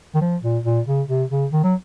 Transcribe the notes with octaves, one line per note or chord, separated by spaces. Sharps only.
D#3
F3
A#2
A#2
C#3
C3
C#3
D#3
F#3